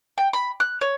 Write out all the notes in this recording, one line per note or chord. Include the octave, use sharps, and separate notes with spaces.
G5
B5
F#6
C#5